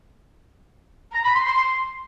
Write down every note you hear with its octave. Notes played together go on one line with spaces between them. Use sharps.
A#5
B5
C6
C6
C6